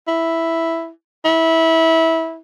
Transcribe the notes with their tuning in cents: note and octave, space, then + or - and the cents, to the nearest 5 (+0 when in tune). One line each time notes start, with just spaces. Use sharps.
E4 +0
E4 -20